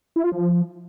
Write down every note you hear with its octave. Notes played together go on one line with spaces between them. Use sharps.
E4
F4
F3